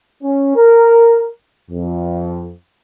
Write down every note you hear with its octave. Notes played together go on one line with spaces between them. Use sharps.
C#4
A#4
F2